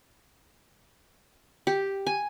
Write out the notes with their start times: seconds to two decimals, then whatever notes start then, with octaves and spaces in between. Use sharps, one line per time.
1.67 G4
2.07 G#5